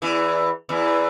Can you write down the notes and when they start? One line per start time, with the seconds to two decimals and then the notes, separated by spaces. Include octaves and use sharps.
0.02 E2 E3
0.69 E2 E3